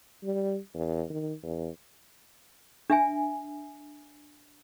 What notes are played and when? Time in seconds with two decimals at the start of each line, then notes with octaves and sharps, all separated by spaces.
0.24 G3
0.74 E2
1.10 D#3
1.43 E2
2.90 D4 E5 G#5